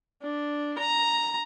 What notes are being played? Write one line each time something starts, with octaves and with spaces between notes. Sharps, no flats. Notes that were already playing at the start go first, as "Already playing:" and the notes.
D4
A#5